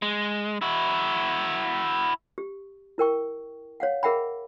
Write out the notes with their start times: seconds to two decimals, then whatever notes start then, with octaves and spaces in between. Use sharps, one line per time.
0.02 G#3
0.62 E4 F#4
2.38 G4
2.98 E4 A#4 G5 C#6
3.80 C#5 F5 F#5
4.03 G#4 A#4 E5 F#5 G5 B5